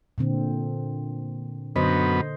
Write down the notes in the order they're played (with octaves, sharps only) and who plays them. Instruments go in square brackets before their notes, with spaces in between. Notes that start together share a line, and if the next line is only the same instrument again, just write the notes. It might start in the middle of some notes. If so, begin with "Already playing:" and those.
[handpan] A#2 D3 C4
[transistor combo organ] F#2 B3 [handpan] D3 C5 D#5